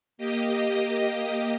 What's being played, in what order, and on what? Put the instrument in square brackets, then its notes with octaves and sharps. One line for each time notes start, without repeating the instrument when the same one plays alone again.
[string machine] A#3 G4 D#5